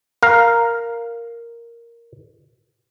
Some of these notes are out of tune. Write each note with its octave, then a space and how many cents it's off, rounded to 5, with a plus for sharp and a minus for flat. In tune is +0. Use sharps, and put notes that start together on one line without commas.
A#4 +0 F5 +0